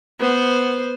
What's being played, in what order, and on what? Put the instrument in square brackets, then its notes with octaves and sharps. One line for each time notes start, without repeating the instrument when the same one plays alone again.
[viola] B3 C5